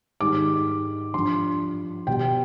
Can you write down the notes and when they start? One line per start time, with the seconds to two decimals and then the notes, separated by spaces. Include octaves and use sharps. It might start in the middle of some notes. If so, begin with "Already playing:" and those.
0.21 G#2 D#3 G3 D6
1.14 G2 F3 C6
2.07 B2 G3 G5